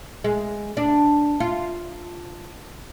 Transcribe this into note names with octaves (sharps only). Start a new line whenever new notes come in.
G#3
D4
F4